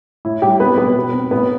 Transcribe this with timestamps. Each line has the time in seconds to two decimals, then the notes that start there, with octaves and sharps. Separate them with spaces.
0.25 A2 E4
0.42 A2 G3 G4
0.60 B3 C4 B4
0.78 B2 B3 B4
0.95 B2
1.14 C4
1.31 A2 B3 B4